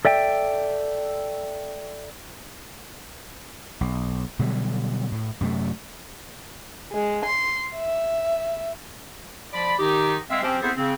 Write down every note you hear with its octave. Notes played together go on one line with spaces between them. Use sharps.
A4 D5 E5 G5
B1
B2 D3 F#3 G3
A2
F#2 C3 A3
G#3
C6
E5
F3 D5 B5
D#3 D#4 G4
G#3 C4 E5 F5
F3 C4 C#4 G4
B3 C4 E4 G#4 A4 C5
C#3 C4